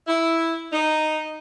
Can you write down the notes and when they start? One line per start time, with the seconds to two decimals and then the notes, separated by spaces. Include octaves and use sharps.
0.08 E4
0.73 D#4